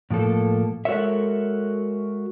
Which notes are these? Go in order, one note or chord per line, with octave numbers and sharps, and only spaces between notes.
A2 F3 A#3 A4
G#3 F#4 A4 A#4 C#5 E5